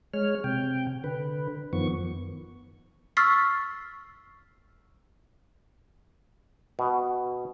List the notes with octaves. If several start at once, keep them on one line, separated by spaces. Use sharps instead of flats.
G#3 C#5 F6
C3 G5
D3 B4
F#2 D#3 F3 B3 C#6
C#6 E6 F6 A6 B6 C7
B2